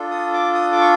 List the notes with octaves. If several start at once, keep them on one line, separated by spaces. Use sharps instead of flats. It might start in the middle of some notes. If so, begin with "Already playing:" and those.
Already playing: D4 F4 A4
D#6
D6
D#6
D6
C#6